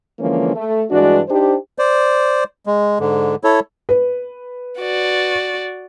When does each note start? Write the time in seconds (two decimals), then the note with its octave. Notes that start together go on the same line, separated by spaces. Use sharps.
0.19 D3 E3 F3 G#3 A#3 C#4
0.55 A3
0.91 G2 E3 G#3 D4 F#4 D5
1.28 D4 D#4 G4 C5
1.79 C5 D5
2.66 G#3
2.99 G#2 D3
3.44 E4 A4 C#5
3.89 B4
4.80 F#4 D5